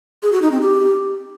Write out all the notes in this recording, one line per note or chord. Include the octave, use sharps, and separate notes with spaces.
G#4
F#4
D#4
C4
G4